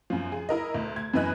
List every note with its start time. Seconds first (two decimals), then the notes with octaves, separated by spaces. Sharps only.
0.10 F#2 F3
0.32 G#4
0.49 E4 A#4 D#5
0.74 D2
0.96 G#6
1.13 F#2 E3 B4 D#5 F#6